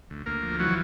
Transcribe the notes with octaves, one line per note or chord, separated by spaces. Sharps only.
D2
D2 A#3 A#4
F3
E3 F#3 F#4